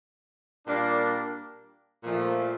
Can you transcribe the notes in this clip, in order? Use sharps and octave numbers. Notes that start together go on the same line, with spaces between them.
A#2 G3 A#3 D4
A#2 F3 A3